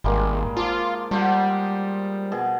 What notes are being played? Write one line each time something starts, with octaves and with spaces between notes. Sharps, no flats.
G#1 G3 G#3 A#3
F3 F4 D6
F3 G3 C5 F#5
B2 G#4